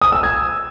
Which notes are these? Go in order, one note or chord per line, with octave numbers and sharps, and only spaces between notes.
D#6
E6
G#6